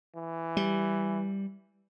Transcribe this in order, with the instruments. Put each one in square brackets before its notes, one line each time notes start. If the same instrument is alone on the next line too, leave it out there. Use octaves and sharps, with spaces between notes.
[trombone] E3
[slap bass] G3